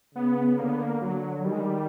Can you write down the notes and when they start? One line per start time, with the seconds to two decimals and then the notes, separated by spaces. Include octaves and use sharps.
0.15 C#3 B3
0.58 D3 A#3
0.69 B3
0.79 A#3
1.01 D3 F#3
1.44 D#3 G3
1.52 G#3
1.60 G3